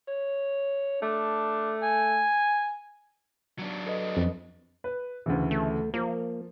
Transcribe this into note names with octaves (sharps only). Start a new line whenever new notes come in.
C#5
A3 D4
G#5
F#3 D4
A4 B4 D#5
F2
B4
D2 C#3 E3
A3
F3 A#3